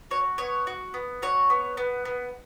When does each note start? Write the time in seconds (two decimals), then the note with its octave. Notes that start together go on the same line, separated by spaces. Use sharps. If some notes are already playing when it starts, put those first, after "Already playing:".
0.11 F#4 C#5
0.38 B3 C#5
0.67 F#4
0.94 B3
1.22 F#4 C#5
1.50 B3
1.77 B3
2.05 B3